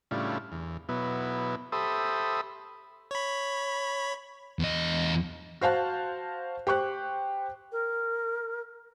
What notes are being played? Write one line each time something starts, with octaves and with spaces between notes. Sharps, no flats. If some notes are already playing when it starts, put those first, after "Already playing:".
A2 C#3 G3 D4 E4 F4
E2
B2 F#3 B3 E4
G4 A4 C5 E5 B5 D#6
C#5 B5
E2 D#5
F#4 C5 F5 A5 F#6
G4 C5 C#6 F#6
A#4